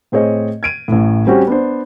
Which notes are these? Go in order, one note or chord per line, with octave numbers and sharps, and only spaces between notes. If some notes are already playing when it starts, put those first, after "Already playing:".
A2 C4 G#4 C#5 D#5
G#6 D7 D#7
A1 A2
G3 C4 C#4 F#4 G4
B3 D4 C5